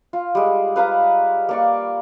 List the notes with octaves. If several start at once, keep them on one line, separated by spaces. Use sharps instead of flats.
F4
G3 G#3
B4 F5 A#5 B5
A#3 D5 C#6